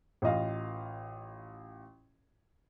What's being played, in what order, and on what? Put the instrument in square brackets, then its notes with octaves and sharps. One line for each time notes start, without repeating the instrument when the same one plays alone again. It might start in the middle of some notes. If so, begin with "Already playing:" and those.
[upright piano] A1 F4 D#5 F5